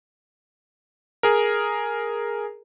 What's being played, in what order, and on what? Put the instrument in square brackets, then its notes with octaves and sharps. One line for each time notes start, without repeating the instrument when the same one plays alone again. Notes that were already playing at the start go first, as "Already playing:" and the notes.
[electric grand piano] G#4 A#4